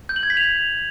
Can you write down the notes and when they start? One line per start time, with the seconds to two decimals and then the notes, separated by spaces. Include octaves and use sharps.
0.09 G6
0.16 F#7
0.23 G#6
0.30 B6
0.37 F7